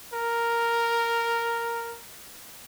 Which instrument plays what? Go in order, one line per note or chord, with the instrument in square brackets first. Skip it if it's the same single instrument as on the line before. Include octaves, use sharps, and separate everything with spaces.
[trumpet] A#4